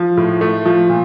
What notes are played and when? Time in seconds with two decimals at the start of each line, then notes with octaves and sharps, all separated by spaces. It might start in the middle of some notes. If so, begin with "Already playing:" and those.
Already playing: F3
0.17 A2
0.41 A3
0.66 F3
0.89 A#2